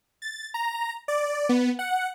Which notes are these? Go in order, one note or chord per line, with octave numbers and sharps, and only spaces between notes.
A6
A#5
D5
B3
F#5